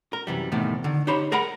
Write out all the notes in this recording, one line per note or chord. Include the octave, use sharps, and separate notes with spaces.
A#4
F#2 C3 E3 G3
E2 A2 C3 D#3
D3 D#3
D#4 G4 C5 C#5 B5
G#4 A#4 F#5 A#5 B5